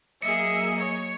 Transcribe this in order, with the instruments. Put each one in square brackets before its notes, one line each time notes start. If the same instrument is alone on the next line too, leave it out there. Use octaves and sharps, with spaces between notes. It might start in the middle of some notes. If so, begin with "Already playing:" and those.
[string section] F#3 A#3 D#5 [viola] G#4 E5 [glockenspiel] C#7
[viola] C#5